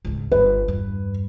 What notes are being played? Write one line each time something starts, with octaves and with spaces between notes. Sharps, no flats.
C#2 G#2
G1 B4
E2 G2